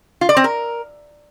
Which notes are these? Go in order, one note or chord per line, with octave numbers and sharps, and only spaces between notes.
F4
D5
C4
A#4